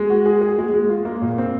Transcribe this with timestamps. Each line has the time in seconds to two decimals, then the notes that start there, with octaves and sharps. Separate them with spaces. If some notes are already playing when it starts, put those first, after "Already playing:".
Already playing: G#3
0.10 F#4
0.26 G#4
0.41 G#4
0.58 G#3
0.74 G#3
0.89 F4
1.05 A#3
1.22 A#2
1.38 C4